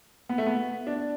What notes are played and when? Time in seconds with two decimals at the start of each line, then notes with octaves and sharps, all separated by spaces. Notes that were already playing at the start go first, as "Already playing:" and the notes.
0.29 B3
0.38 A3
0.46 B3
0.87 D4